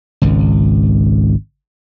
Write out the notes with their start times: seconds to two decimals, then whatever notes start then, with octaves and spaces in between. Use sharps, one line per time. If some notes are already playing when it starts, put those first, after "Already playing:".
0.22 G#1 C#2